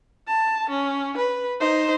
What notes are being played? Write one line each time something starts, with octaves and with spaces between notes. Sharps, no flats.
A5
C#4
B4
D#4 C5